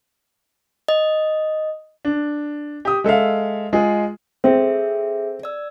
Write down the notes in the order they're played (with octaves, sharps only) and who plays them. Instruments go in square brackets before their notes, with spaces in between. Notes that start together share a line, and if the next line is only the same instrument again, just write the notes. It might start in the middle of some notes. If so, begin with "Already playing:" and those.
[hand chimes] D#5
[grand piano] D4
G4 D#6
G#3 A4 E5 F5
G#3 F4 G#4
[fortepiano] C4 [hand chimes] G#4 A4 E5
[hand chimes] D5 E6